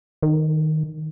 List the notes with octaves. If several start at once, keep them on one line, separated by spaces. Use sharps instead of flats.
D#3